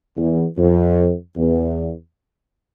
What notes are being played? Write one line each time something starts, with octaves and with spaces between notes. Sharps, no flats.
E2
F2
E2